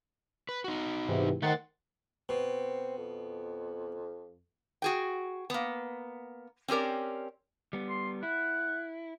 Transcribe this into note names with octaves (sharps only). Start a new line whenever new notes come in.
B4
D#4 F#4
G#2 C3 E3
D#3 A3 C5 F#5 A6
B2 C4
F2
F#4 G#4 G5
A#3 B3
C4 C#4 G4 A#4 D5
G3 B3
C6
E4 F#5